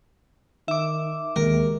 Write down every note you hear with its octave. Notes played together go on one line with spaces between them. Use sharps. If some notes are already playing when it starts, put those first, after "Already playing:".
D#3 E5 D6
D#2 G#3 A#4